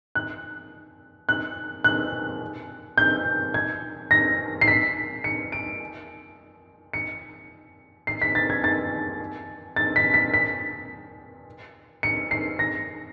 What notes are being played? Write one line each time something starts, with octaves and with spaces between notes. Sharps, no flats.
F#6
F#6
F#6
G6
G#6
A#6
C7
B6
C#7
D7
C#7
C7
B6
A6
G#6
A6
A6
B6
B6
B6
C#7
C7
A#6